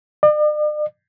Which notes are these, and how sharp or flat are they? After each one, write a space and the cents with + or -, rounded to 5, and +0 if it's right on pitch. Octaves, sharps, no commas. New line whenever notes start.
D5 +45